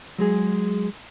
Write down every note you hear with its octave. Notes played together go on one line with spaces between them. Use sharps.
F#3 G#3 G#4